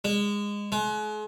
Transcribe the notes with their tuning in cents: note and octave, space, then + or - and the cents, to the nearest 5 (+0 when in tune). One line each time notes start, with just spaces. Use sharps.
G#3 -20
G#3 +40